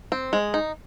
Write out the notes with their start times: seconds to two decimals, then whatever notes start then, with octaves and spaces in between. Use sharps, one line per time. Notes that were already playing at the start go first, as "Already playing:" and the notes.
0.12 C4
0.33 G#3
0.54 D#4